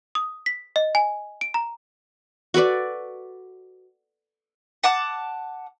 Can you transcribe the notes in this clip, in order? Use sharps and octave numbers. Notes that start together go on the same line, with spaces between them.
D#6
B6
D#5
G#5
D7
A#5
F#4 A4 B4 D5
F#5 A5 D6